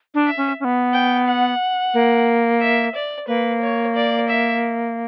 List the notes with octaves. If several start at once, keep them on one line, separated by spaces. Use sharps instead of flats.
D4
E5
C#4
C#4
B3
G5
F#5
A#3
E5
D5
A#3 B4
C#5
D5
E5